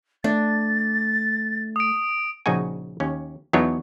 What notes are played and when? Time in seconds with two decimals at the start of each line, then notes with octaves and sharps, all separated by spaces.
0.24 A3 D4 A6
1.76 D#6 D7
2.46 A#1 C#3 D#4 F#4 G#5
3.00 D#2 C#4
3.53 E2 F#3 B3 D4 D#4 C#5